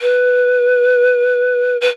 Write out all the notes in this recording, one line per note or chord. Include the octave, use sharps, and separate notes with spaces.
B4
B4